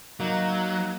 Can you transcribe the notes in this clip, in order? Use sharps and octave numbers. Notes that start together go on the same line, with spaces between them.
F#3 A#3 D#4